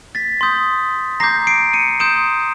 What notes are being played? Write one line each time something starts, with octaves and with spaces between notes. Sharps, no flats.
A6 B6
C6 D#6 G6
A#5 D6 G6 A#6 C7
C7 D7
C#7 D#7
C6 D#6 G6 D7 E7